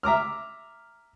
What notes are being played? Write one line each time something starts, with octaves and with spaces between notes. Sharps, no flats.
E5 A#5 D6 F6